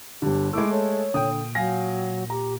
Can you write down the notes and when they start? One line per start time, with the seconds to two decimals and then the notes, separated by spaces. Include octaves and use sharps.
0.22 G1 D3 G4
0.53 G#3 A3 E4 D6 E6
0.71 A4 C#5
1.14 A#2 D3 G5 D#6
1.55 F#3 F5 G#5 A#6
2.30 G4 A#5